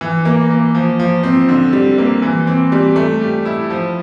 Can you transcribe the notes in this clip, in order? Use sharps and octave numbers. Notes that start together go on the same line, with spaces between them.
E3
A#3
A#3
F3
F3
C4
D3
G3
A#3
E3
C4
G3
A3
G4
E4
F3